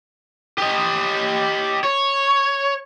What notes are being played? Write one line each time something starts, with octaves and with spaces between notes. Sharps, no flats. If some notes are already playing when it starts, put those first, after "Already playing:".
G4 D#5
C#5